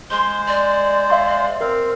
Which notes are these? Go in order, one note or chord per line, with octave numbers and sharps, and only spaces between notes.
G#3 C5 C6
D5
E5 F5 C6
C4 A#4 F5